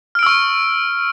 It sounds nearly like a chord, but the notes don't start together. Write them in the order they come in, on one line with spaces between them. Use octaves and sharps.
F6 D7 E6 C#6